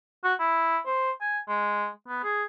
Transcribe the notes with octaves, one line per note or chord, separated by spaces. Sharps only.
F#4
E4
C5
G#5
G#3
B3
G#4